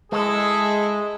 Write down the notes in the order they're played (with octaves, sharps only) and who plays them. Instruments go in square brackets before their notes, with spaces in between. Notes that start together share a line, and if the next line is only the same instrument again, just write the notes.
[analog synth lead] G#3 [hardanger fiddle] E4 A4 [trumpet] G#4